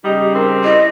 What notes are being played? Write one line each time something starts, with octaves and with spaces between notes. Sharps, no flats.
C#3 G3 D#4 G4
C4 A#4
E4 D#5